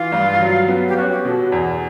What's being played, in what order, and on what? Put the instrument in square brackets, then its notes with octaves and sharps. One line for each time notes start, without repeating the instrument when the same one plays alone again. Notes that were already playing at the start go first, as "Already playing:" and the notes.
Already playing: [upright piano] E3 [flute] F4
[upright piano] G2
F#3
B3
[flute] G4
[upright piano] C#4 [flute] F#4
[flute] G4
[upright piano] B2 [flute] A4
[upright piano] E2